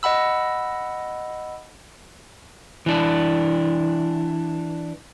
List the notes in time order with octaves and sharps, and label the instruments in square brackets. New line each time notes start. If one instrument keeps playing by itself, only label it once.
[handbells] D#5 F#5 B5 E6
[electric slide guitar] E3 D4